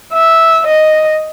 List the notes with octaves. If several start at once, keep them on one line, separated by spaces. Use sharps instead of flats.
E5
D#5